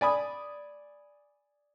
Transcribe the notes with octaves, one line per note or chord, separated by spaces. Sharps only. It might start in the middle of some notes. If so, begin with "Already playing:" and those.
D5 G#5 B5 D#6